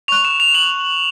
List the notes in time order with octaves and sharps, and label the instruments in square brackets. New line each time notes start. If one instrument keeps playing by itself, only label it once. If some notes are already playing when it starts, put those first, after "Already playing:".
[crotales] C#6 F#6 F7
E7
F7
F#7